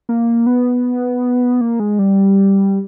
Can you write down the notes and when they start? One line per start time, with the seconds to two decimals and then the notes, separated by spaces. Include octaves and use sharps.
0.09 A#3
0.47 B3
1.61 A#3
1.80 G#3
1.99 G3